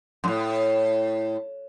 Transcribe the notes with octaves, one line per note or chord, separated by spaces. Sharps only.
F#2 A2